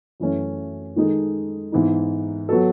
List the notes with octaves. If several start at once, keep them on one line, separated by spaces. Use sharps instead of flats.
F#2 E3 A3 C#4
D#3 G#3 D#4 A4
G#2 E3 B3 D#4
F#3 B3 F#4 A4